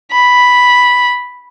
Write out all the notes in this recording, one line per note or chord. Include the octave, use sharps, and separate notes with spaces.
B5